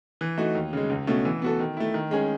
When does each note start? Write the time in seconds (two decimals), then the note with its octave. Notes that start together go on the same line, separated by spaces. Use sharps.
0.21 E3
0.38 A3 D#4 F#4
0.55 D#2
0.73 C#3 G#3
0.90 C#2
1.07 B2 A3 C#4
1.25 E3
1.42 B3 F#4 A4
1.59 D#3
1.77 A3 E4
1.94 D#3
2.11 G#3 C#4 G#4